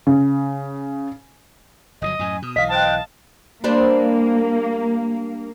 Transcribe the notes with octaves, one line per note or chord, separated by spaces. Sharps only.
C#3
G1 B2 F#3 D#5
F#2 A2 G#5
B2 D#6
B1 E3 D#5 F5 B6
C5 G5 A5 F#6
G3 A#3 D4 C5